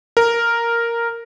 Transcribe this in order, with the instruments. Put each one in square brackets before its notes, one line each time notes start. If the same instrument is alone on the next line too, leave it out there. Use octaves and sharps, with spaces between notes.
[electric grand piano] A#4